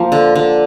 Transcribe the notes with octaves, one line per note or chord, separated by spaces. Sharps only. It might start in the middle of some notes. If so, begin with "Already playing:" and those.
Already playing: F3 A#3
D3
D3